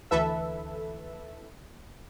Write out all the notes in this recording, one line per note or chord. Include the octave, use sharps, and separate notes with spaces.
D2 E3 A4 B4 E5